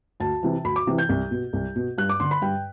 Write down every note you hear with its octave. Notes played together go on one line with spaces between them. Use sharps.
D2 A5
C3 E3
D2 B5
D6
C3 E3
G6
C2
B2
C2
B2
G2 F#6
D6
D3 C6
B5
G2 G5